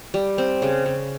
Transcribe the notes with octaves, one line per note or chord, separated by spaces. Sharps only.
G3
C4
C#3
C#3